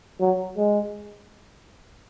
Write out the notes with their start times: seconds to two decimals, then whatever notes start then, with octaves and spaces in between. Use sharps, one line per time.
0.20 F#3
0.57 G#3